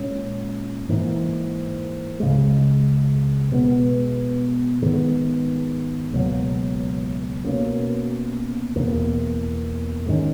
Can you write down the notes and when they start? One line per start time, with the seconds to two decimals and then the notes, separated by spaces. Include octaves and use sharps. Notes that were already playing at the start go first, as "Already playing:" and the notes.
Already playing: A#2 G#3 C#4
0.89 G#2 E3 A#3
2.20 C#2 C#3 G#3
3.52 B2 G#3 B3
4.82 G#2 D#3 G#3 B3
6.13 C#2 B2 F#3 A#3
7.44 B2 A#3 C#4
8.76 E2 B2 A#3
10.06 G#2 D#3 G#3 C#4